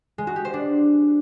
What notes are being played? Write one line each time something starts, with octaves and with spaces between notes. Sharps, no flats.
G#3
F#4
G4
C5
D4